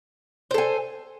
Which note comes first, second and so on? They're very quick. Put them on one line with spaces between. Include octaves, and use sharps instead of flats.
C5 A4 G#5